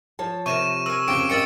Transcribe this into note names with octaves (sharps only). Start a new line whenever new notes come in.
F3 C#5 A5
C3 A#4 C#6 D#7 E7
A#4 G#5 E6
F2 C#3 C4 G5 D6 D7
A#4 D#5 G5 E6 A6 C#7